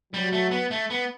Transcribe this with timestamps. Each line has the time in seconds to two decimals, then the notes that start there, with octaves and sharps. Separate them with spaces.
0.13 F#3 G3
0.33 A3
0.51 B3
0.71 A3
0.90 B3